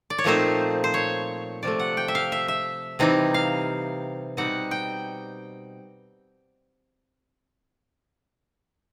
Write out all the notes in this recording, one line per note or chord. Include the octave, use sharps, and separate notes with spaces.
D5
C#5
A#2 F3 A3 C4 D#4 C5
C5
C#5
C3 F3 A3 D5
F#5
G5
E5
F5
E5
E5
C3 E3 G3 C4 D#4
F5
B2 G3 C4 D#4 F#5
G5